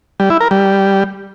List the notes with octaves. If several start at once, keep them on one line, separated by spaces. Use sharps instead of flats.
G3
E4
A#4
G3